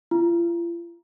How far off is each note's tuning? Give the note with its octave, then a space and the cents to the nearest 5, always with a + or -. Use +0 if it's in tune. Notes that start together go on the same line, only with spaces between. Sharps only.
F4 -45